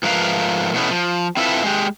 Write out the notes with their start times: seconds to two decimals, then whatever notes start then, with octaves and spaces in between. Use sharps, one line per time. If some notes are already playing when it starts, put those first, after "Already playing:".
0.03 G#2 F3 A3 A#4 B4 F5
0.74 B2 E3 A3 B3 C#4
0.91 F3
1.37 C4 E4 F4 A4 B4 E5
1.64 G#3 G4